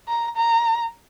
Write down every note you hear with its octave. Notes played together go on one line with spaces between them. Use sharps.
A#5
A#5